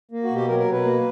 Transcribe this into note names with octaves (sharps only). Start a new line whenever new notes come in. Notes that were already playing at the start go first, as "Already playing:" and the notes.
A#3
F#4
B2
G4
F#3 A#4
A#4
B2
B4
A#3